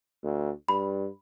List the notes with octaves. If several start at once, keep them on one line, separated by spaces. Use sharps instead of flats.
D2
G2 B5